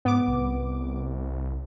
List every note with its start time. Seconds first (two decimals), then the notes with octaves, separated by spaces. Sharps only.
0.05 G#2 B3 D6
0.28 C2